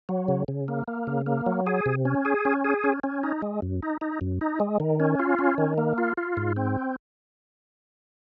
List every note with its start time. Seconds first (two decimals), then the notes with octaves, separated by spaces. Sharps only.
0.09 F#3
0.28 C#3
0.48 C#3
0.68 A#3
0.88 A#3
1.07 C#3
1.26 A#3
1.46 F#3
1.67 G#4
1.86 C3
2.05 C#4
2.25 G#4
2.45 C#4
2.64 G#4
2.84 C#4
3.03 C#4
3.23 D#4
3.42 G#3
3.62 F#2
3.83 D#4
4.01 D#4
4.21 F#2
4.41 D#4
4.60 G#3
4.80 D#3
5.00 C#4
5.19 F4
5.39 C#4
5.58 D#3
5.78 A#3
5.98 F4
6.17 F4
6.37 G#2
6.56 C4